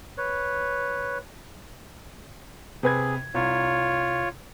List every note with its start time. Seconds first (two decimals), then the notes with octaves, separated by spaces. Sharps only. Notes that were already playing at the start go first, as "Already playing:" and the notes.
0.18 B4 C#5
2.83 C3 G#4 B4 G#6
3.34 C2 F4 C#5